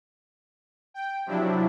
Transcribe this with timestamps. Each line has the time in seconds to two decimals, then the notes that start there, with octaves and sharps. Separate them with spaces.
0.94 G5
1.26 C3 F3 F#3 D4 E4